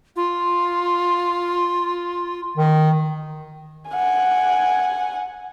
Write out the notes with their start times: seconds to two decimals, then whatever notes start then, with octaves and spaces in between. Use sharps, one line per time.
0.16 F4
2.58 D#3
3.90 F#5 G#5